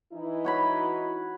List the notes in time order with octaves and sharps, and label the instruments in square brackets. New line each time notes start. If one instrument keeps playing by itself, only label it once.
[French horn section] E3 D#4 E4
[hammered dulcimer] F#4 C#5 B5